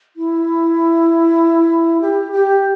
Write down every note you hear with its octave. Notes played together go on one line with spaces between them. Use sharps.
E4
G4
G4